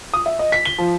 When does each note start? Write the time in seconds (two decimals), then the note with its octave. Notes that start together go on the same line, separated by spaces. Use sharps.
0.14 D#6
0.26 E5
0.39 D#5
0.52 B6
0.65 G7
0.78 F3